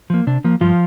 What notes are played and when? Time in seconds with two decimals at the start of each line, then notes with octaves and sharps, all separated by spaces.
0.10 F3 A#3
0.27 C3 D4
0.44 F3 A#3
0.61 G2 F3 F4